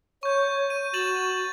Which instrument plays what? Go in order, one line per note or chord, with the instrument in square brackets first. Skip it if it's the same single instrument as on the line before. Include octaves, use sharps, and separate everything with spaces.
[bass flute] C#5 [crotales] C#6 G6
[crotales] D#7
[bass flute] F#4 [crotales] A6 E7 F#7